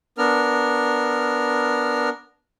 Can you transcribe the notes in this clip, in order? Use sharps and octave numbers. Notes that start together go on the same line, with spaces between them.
B3 D4 A#4 F6